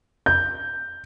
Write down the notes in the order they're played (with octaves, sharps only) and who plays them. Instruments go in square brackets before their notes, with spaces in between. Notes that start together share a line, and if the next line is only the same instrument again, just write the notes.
[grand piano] G6